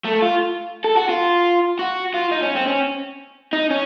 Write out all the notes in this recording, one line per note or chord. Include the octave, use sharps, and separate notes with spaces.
A3
F4
A4
F#4
F4
F#4
F4
D#4
C#4
C4
C#4
D#4
C#4